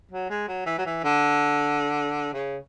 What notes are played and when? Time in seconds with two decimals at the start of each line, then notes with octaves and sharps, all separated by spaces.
0.11 F#3
0.30 G#3
0.48 F#3
0.66 E3
0.78 F#3
0.86 E3
1.04 D3
2.33 C#3